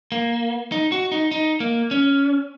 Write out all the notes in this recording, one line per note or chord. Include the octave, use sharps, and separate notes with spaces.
A#3
D#4
F#4
D#4
D#4
A#3
C#4